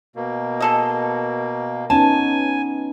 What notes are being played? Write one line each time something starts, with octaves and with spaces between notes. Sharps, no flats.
B2 A#3
G#4 A4 D#5
B3 C#4 D#4 G#5 A5